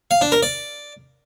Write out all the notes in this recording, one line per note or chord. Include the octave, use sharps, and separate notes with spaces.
F5
D4
A#4
D5